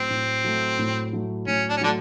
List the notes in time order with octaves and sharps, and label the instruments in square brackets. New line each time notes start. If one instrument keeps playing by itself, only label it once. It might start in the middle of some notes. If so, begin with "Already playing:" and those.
Already playing: [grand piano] A2 F#3 A3 [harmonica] C4
[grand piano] A2
F#3 A3
A2
F#3 A3
[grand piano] A2 [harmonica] C#4
[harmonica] D4
C#4
[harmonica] D3 D4 [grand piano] F#3 A3